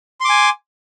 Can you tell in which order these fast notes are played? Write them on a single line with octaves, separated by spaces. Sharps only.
C6 D6 G#5